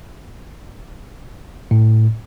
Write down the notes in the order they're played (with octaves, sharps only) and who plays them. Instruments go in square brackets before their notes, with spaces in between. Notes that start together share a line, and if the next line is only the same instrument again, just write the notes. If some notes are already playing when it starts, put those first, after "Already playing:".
[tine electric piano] A2